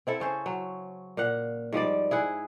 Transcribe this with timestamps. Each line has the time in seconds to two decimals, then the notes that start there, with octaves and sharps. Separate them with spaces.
0.07 C4 E4 A4
0.20 C#3 C#4 C5
0.46 F#3
1.17 A#2 F5 F#5
1.72 G#2 F3 G3 D5
2.11 E4 G#4 F#5